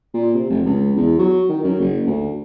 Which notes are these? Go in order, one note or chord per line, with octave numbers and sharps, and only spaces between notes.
A#2
C3
F1
C#2
E2
F#3
D#3
F#2
F#1
D2